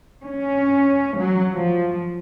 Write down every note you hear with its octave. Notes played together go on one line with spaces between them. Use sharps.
C#4
F#3
F3